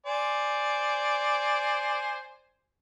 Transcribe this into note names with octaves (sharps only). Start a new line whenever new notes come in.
C5 D5 G#5